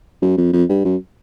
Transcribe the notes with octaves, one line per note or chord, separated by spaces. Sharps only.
F#2
F2
F2
G2
F#2